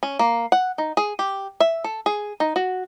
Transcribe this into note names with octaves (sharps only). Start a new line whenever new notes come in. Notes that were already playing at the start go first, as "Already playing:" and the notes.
C#4
A#3
F#5
D#4
G#4
G4
E5
A4
G#4
D#4
F#4